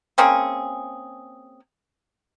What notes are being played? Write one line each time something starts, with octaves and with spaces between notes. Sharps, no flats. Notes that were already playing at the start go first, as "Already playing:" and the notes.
A#3 C4 C#4 G#4